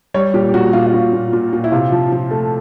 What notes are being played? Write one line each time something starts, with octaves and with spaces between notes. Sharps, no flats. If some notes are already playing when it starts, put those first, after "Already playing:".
G3 C#5
A#2 G4
G4
A#2 F#4
A#2 F4
F4
A#2 F#4
A#2
A#2
A#2
E4
C3 F4
F3
F3
A3